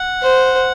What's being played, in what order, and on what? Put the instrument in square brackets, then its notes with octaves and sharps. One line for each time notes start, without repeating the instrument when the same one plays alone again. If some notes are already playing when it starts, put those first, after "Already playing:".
Already playing: [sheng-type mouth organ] F#5
[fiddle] C5